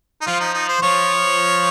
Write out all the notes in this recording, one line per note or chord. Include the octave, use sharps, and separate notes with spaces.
D#4
F3 F4
D#4
D#4
C5
F3 C#5